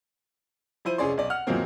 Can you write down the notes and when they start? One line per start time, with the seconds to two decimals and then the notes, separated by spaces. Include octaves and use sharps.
0.85 F3 E4 C5 D#7
0.98 F1 C#4 G#4 D5 C6
1.17 B1 D5
1.30 F#5 F6
1.47 E2 G#2 F3 F#3 A#3 C4